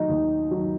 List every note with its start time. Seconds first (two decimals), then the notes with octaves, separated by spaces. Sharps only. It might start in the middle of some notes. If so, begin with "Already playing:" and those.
Already playing: D#3 F#3 D#4
0.09 D#2
0.51 D#3 F#3